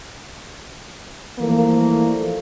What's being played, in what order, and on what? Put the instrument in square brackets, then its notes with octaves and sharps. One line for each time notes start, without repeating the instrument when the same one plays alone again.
[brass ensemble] E3 F3 G3 A3 A#3